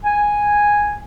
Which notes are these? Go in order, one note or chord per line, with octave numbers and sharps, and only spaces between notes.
G#5